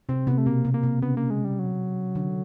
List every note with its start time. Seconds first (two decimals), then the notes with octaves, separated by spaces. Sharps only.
0.09 C3 C4
0.27 C3 B3
0.38 A3
0.46 B2 A#3
0.65 C3
0.74 A#3
0.83 C3
1.02 C#3 B3
1.17 A#3
1.30 G#3
1.44 G3
1.59 F#3
2.15 D3